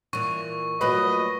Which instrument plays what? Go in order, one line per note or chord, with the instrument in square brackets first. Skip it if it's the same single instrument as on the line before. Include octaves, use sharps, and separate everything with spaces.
[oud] A#2 E3 [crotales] C#6
[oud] A#2 F#3 A3 [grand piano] B4 [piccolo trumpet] D#5